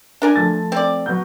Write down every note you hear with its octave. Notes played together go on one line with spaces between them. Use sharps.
D4 A#4 G#5
F3 A3 A6
C4 D5
F#3 B3 G6